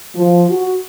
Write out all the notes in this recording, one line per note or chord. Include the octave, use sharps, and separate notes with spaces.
F3
F#4